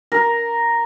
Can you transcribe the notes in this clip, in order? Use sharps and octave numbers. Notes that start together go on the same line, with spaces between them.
A#4